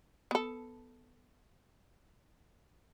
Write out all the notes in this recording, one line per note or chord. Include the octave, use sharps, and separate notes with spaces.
B3 A4